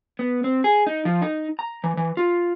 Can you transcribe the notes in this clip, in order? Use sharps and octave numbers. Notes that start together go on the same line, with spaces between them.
B3
C4
G#4
D#4
F3
D#4
A#5
E3
E3
F4